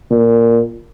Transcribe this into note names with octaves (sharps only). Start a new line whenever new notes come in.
A#2